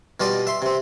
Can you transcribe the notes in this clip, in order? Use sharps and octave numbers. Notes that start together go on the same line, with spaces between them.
B2 G3 F4 D5 D#5
E5 C6
C3 C4